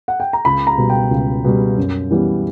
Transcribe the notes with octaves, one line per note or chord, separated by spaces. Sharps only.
F#5
G5
A#5
C#2 B5
A#5
B2 G3
G5
C#2
B2 G3
F#2
E3 G3 B3